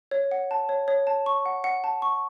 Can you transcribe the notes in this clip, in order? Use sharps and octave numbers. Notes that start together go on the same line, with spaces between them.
C#5
F#5
A5
C#5
C#5
A5
C#6
F#5
F#5
A5
C#6